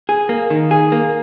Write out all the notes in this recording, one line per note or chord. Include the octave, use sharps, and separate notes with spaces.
G#4
A#3
D#3
G#4
A#3